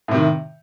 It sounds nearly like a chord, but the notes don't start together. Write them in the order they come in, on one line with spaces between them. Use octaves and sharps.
A2 C3 D#3